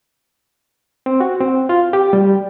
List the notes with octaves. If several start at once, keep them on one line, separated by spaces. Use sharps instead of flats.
C4
F#4
C4
F4
G4
G3